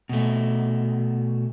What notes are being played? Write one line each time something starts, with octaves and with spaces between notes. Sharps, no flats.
B2 A3